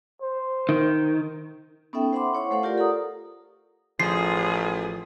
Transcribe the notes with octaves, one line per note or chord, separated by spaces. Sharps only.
C5
D#3
B3 C#4 D#4 A4 E5 G5
C5 E5 F#5 B5 C6 D6
E4 C#5 F#5 C#6
A3 A4 C5 F5 F#5
F4 G4 A#4 D5
A4 F#5 A#5 D#6
A1 F3 G#4 C7